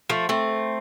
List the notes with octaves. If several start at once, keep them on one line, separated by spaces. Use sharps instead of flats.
F3 A3
A3 C4